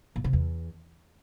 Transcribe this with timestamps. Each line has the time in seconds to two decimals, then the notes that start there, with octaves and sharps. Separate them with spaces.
0.16 A#2
0.24 C3
0.33 E2